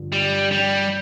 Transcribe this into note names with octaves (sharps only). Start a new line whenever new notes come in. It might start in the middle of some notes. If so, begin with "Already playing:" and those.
Already playing: G2 D3 F3
G3
G3